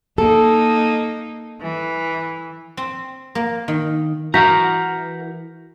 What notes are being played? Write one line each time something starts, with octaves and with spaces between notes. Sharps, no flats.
A#3 D#4 A4
E3
C4
A#3
D#3
E3 F#4 A#4 F#5 A#5 G6 A#6 B6